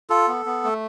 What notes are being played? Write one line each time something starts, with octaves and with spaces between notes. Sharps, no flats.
F4 A4
B3
B3
A3